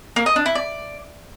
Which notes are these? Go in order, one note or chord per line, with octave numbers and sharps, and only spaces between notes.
A#3
D#5
D4
E4
D5